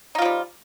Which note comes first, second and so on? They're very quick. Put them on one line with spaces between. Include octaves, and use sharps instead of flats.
D#4 F4 F3 G3